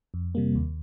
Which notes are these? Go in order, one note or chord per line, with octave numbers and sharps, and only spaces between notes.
F2
C3 G3 A#3
D#2